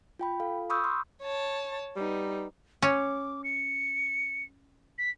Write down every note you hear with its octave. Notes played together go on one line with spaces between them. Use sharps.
F4 G5 B5
F4 A4 F5
B5 C#6 D#6 E6 G6
C6 F6
C#5 A5
G3 B3 D#4
C#4 D6
C#7
B6